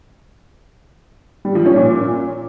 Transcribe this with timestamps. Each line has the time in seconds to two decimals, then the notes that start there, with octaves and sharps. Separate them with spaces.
1.45 G3
1.55 F3
1.66 C#4
1.76 A#2